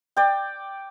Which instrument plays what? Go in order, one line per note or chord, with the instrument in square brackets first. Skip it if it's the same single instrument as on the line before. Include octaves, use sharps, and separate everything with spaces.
[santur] D5 G5